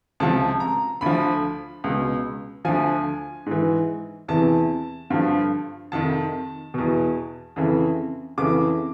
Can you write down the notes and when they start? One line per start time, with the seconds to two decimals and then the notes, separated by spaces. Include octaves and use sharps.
0.20 C#2 C3 F3 A5
0.60 A#5
1.01 D2 D3 F3 B5
1.84 C#2 B2
2.65 D2 D3 F3 G#5
3.46 G#2 E3
4.28 E2 C3 E3 A5
5.10 G2 D3 F3
5.92 F2 C3 D#3 A5
6.74 E2 B2
7.56 F2 C#3 E3
8.38 F2 C#3 E3 D6